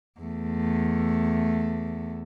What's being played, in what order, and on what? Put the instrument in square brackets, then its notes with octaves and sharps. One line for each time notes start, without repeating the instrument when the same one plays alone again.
[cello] E2 A3